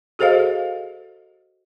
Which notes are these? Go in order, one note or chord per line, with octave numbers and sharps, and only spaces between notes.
F#4 G#4 A4 C5 D#5 F5